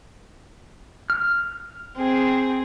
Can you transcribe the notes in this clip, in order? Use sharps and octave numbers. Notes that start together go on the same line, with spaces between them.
F6
C4 G#4